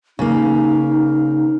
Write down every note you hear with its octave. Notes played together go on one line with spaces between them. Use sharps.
C#3 A#3 D#4